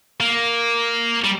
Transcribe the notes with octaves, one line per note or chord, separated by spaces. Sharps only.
A#3
G3